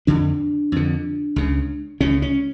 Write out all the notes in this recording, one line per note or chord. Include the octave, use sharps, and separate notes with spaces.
F2 D3 D4
F2 D3
C#2 C#3
C#2 C#3 C#4
C#4